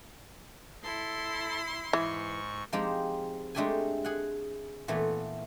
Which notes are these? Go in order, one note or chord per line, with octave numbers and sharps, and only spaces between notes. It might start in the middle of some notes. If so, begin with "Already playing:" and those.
E4 A4 C6
G#2 E3 C#6
F3 G#3 C4 D#4 G4
G#3 A3 D4 G4 A4 G#5
G#4 F#5
A#2 E3 A3 B3